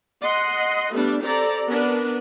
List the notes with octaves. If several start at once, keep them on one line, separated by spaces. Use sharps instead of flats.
D#5 F#5 C6
G3 A3 B3 D4
C4 G4 A4 D5 A#5
B3 D4 A#4 B4